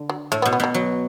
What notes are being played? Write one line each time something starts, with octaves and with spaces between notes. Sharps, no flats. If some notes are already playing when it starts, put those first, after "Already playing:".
Already playing: D3
F#3
A2 A3
B3
B2
B3
B2 F#3
F#3